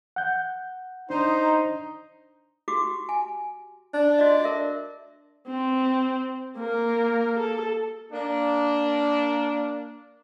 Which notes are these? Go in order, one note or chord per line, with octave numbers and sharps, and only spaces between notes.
F#5 G6
D4 D#4 C5
F#4 G4 D6
G#5
D4
F#4 D5 D#5
A#4 E5
C4
A#3 A#4
A4
A#3 D4